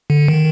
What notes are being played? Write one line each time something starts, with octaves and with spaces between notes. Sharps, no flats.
D3
D#3